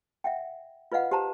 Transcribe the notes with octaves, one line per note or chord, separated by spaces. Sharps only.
E5 F#5 G5
F4 B4 D#5 F5 F#5
G4 C5 A5 A#5